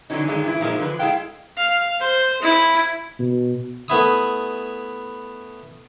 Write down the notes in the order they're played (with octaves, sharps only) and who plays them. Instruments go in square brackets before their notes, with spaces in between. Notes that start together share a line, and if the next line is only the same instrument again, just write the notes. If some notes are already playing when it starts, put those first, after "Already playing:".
[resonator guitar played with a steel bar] D3 E3 F#3 G#3 C#4 D#4
G2 D3 D#3 G#3 C#4
G2 E3 E4
A#2 F3 G#3 D#4 A#4
D3 E3 F3 B4
G#3 E4 G#4 A4 F5 G5
[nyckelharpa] F5
C5
E4
[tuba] B2
[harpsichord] A3 B3 E4 D#6